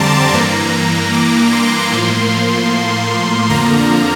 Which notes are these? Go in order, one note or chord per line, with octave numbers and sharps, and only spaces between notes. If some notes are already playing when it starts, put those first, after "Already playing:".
Already playing: F2 D3 G3 C4 A5 A#5 C6 D6
G2 E3 A#3 A#5
D6
C6
A2 F3 A#3
F2 D3 F3 A#3 A#5